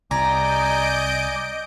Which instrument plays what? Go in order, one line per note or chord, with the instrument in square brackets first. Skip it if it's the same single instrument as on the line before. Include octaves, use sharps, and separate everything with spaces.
[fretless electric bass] C2 [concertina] D5 G#5 D6 [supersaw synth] D#5 G6 D7 [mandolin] A#5